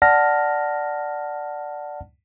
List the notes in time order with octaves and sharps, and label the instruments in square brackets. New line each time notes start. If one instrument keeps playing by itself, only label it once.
[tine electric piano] D5 F#5 A5 F6 A#6